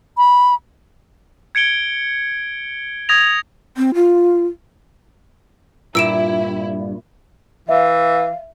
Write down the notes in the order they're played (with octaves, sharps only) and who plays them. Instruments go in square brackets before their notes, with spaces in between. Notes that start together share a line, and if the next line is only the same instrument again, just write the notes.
[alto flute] B5
[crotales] G#6 C#7 D7 G7
D#6 G#6 A#6 F7
[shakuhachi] C4
F4
[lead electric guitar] G2 [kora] A#2 [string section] E4 [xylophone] E6 D7 E7
[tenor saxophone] E3 [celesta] E5 [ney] F5